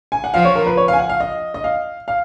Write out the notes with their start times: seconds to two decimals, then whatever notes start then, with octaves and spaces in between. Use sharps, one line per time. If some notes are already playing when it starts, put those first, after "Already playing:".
0.12 G#5
0.24 F#5
0.34 F3 F5
0.45 C#5
0.56 A#4
0.66 B4
0.77 C#5
0.88 F5
0.93 G#5
0.99 F#5
1.09 F5
1.20 D#5
1.54 D#5
1.64 F5
2.08 F5